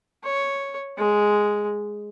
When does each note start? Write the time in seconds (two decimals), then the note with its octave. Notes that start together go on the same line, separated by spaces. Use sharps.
0.24 C#5
0.98 G#3